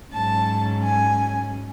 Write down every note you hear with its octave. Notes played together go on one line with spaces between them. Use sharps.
G#2 F#3 C#4 A5
G#5